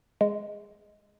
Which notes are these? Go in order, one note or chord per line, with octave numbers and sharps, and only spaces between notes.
G#3